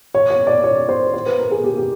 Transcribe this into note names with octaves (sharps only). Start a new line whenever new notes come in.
C#5
C#5
D5
C#5
C5
C5
B4
A#4
G#4
G4
G4